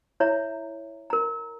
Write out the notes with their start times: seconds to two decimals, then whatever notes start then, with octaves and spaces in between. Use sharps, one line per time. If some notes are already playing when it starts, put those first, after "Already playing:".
0.20 E4 C#5 E5 A#5
1.10 A#4 A#5